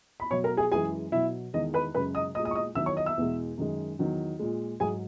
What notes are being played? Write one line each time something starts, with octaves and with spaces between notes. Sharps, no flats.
B5
B2 F#3 C#5 C#6
A#4 A#5
G#4 G#5
F#2 E3 G#3 G#4 G#5
B2 F#3 E4 E5
E2 D#3 G#3 D#5
B4 B5
F#2 C#3 G#3 B4 B5
D#5 D#6
A#2 G#3 D#5 D#6
D#5 D#6
C#6
D#5 D#6
E2 D#3 F#3 E5 E6
C#5 C#6
D#5 D#6
E5 E6
E2 B2 G#3
F#2 D#3 G#3
E2 D#3 F#3
A#2 G#3
G#2 F#3 G#4 G#5